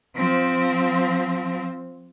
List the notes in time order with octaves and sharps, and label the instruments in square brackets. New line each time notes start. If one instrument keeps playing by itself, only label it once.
[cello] F3 C4